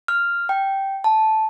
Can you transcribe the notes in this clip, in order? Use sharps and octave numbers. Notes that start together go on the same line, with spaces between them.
F6
G5
A5